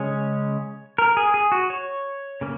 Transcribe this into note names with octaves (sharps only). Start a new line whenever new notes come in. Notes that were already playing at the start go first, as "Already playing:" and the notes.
Already playing: C#3 G#3 C#4 C#5
A#4
G#4
G#4
F#4
C#5
C#3 A#3